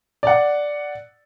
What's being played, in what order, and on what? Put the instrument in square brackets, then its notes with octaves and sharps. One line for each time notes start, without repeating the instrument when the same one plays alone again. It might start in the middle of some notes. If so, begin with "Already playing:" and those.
[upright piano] D5 F#5